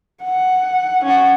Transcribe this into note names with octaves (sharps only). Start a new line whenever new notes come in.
F#5
C#4 F#5